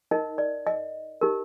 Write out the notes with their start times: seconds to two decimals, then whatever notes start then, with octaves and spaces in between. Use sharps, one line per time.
0.11 D#4 A#4 D#5
0.38 D5
0.67 D#5
1.21 D#4 G4 A#4